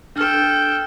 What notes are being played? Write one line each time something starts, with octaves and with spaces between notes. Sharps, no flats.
D4 A4 G5 F6